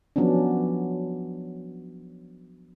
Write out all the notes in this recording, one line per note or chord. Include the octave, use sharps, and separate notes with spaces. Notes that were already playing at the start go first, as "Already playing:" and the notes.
F3 F#3 B3 C#4 D4